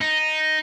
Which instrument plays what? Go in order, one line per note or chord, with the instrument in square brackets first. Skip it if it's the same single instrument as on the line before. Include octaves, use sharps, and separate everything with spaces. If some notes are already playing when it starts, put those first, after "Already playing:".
[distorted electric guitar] D#4